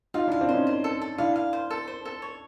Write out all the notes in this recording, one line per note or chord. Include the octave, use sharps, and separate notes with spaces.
D#4 F4 F5
D4 E4
F5
C4 D4
C#4 D#4 C5
C5
A4
A4
D4 E4 F5
F5
C5
A4
C5
A4
C#5